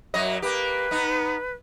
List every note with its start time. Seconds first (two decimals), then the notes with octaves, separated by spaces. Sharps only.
0.14 F#2 F#3 D#5
0.42 A#3 G4 B4
0.91 B3 D#4